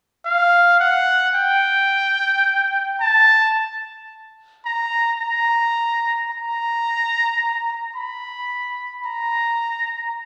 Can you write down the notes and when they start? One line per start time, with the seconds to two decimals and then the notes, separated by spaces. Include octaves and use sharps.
0.25 F5
0.80 F#5
1.35 G5
3.01 A5
4.66 A#5
5.20 A#5
6.31 A#5
7.96 B5
9.06 A#5